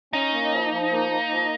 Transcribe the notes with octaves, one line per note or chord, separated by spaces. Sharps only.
C#4 D#4
A#3
F3
F3
A#3
A#3
F3